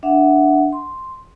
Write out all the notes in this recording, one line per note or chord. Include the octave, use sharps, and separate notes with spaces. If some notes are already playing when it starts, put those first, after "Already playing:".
D4 E5 F#5
C6